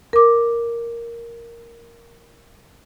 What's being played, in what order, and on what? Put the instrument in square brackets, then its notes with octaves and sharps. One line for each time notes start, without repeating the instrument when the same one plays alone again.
[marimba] A#4 D6